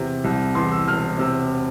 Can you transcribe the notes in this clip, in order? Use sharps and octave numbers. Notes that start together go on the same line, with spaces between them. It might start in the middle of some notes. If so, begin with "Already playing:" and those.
Already playing: E2 C3
C2
E2 C6
E6
E1 F6
C3 E6